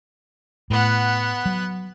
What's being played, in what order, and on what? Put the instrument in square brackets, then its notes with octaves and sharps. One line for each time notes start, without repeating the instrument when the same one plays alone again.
[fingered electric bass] A2 [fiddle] B3 F#5
[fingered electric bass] F#3